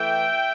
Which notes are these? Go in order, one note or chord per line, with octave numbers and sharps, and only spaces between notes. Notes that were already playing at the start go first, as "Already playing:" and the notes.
Already playing: E3 A3 E5 G5